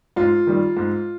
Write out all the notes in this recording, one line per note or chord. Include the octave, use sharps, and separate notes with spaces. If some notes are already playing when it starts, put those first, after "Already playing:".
G#2 F4
D#3 G3
G#2